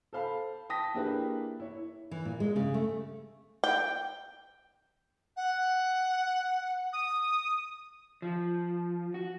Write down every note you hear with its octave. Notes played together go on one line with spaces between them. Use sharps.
A4 C5 F5 B5
G5 A5 D#6 A#6 B6
A#3 D4 E4 G4 G#4 B4
E4 C#5
E3
A#2
G#3
C#3
A3
G5
F#5
D#6
F3
F#4